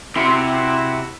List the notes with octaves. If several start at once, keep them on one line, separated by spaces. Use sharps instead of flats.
C3 E4 F#4 C6